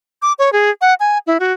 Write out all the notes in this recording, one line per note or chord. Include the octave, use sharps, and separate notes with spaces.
D6
C#5
G#4
F#5
G#5
E4
F#4